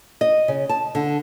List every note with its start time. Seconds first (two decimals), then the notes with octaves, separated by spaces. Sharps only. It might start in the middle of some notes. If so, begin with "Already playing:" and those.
0.21 D#5
0.48 C#3
0.69 A5
0.95 D3